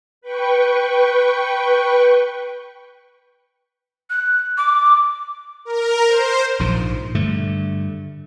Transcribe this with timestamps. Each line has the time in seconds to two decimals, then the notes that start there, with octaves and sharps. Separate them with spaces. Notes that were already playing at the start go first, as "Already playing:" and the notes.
0.21 B4 G5 C#6
4.09 F#6
4.57 D6
5.65 A#4
6.07 C5
6.59 A#1 G#2 F3
7.15 G2 D3 A3